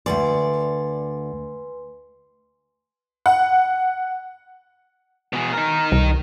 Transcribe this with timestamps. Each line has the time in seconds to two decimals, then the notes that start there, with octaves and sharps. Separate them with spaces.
0.06 D2 G#2 B4 D5 G#5 C6
3.26 F#5
5.33 B2 G#4
5.53 D#4 A#4
5.92 C2